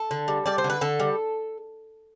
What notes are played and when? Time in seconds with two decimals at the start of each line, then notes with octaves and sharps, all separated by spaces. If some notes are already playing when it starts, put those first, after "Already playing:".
Already playing: A4
0.11 D3
0.28 G3
0.46 G3 D5
0.58 C5
0.64 D3
0.70 B4
0.81 D3 A4
1.00 G3